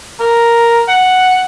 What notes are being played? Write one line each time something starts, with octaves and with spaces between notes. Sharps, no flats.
A#4
F#5